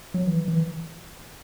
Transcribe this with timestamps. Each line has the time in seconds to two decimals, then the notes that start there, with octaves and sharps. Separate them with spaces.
0.14 F#3
0.27 E3
0.48 E3